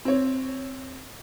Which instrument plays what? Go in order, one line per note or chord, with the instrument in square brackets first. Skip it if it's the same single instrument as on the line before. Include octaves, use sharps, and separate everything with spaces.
[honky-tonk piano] C4 C#5